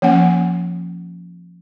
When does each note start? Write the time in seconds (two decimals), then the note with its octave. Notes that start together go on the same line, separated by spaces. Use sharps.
0.02 F3 A#3 C#4 F#5